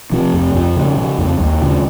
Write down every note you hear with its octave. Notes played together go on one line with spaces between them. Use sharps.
C3 F3
F2
F2
C#3
C#3
F2
D#2
C#3